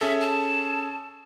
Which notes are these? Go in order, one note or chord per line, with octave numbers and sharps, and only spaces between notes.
C#4 G#4 A4 E5
A5